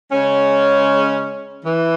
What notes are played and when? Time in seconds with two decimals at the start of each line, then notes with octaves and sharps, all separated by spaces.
0.12 C#3 G#3 C#4
1.65 E3